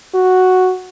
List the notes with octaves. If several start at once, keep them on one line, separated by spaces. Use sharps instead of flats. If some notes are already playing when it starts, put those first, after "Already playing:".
F#4